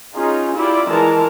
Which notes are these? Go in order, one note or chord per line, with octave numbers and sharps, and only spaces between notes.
C#4 D#4 F4 G#4
E4 F4 G4 D5
E3 G#3 A#4 A5 A#5